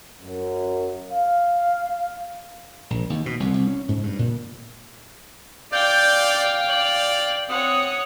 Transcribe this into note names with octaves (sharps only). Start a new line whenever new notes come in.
F#2
F5
A#1
D#2
B2
C2
C2
C#4
G#2
G2
A#2
D5 F5 G5 G6
D5 F#7
C4 C#5 F#5 D#6